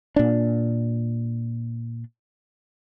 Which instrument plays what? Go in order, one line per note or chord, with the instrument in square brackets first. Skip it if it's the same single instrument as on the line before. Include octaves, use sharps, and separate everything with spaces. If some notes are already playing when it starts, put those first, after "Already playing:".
[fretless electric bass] A#2 D4